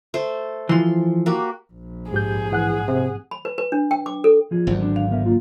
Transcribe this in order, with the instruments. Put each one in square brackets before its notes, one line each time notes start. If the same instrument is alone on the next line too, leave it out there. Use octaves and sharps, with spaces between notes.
[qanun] A3 C5
[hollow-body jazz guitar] E3 F3 [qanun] C6
[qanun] A#3 F#4 G4
[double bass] A#1
[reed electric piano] G#2 G4 G6 [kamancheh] G#4
[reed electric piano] G#2 F#5 F#6 [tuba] E3
[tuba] C3
[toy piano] B5
B4
B4
D4
G5
D6
A4
[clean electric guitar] F3 F4 G#4
[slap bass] G#1 D2 [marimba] F#3
[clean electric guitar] D4
[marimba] F5
[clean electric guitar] B3 A#4 E5
A#3 F4